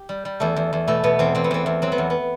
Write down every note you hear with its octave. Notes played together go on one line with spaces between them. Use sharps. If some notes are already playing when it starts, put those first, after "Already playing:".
Already playing: G4
G3
G3
E2 A3 A4
E2
E2
B2 A3 A4
B2 B3
E2 C4
E2 C4
B3
E2 C4
E2
F#3 C4
B3
E2
B3